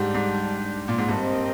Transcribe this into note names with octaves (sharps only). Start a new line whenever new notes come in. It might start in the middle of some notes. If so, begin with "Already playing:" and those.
Already playing: G#2 G3 D4 G4
G#2
A#2
G#2
G2 C4 G4 A#4 D#5